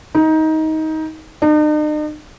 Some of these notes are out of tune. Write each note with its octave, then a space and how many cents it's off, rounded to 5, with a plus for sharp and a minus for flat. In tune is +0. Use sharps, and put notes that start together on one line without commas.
D#4 +20
D#4 -45